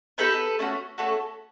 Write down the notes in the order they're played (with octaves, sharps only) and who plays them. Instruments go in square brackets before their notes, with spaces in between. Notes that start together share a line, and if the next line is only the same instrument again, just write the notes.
[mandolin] B3 D#4 G4 A4 B4
A3 C#4 F#4
A3 C#4 F#4 A4